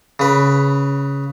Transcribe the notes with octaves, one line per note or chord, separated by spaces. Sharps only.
C#3 B4